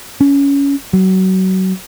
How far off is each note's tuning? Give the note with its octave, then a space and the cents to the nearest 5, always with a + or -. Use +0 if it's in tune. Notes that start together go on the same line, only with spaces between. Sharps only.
C#4 +15
F#3 +25